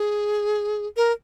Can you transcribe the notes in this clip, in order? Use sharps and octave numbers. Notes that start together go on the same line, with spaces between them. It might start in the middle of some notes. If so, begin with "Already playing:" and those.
Already playing: G#4
A#4